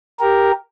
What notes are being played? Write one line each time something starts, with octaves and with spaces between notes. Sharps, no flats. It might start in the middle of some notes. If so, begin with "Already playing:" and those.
G4 A#4